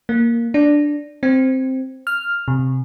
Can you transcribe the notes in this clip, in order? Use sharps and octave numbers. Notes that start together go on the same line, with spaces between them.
A#3
D4
C4
F6
C3